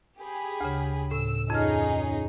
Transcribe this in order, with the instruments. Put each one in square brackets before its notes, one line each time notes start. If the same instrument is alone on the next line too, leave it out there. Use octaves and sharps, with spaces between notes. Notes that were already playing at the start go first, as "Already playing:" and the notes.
[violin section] G4 G#4 B5
[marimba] D2 C#3
[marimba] A2 [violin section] E6
[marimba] F2 F6 [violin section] C#4 D#4 G#4